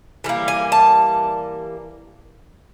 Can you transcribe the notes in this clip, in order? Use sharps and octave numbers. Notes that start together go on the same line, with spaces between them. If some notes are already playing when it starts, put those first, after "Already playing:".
E3 G3 A#3
G#5
A5